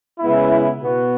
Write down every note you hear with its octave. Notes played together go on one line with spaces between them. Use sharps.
C#3 G#3 B3 E4
B2 B3 F#4